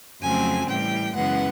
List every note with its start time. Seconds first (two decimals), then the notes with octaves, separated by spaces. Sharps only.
0.21 F2 C#3 F#3 A3 C4 G#5
0.68 A2 E3 G3 G5
1.15 F#2 C#3 E3 G#3 B3 F#5